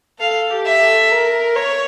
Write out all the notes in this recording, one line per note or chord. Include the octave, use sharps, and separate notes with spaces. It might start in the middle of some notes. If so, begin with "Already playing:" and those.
A4 F5
G4
E5
A4
A#4
C#5